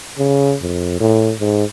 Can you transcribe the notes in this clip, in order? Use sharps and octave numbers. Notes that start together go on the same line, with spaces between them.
C#3
F2
A2
G#2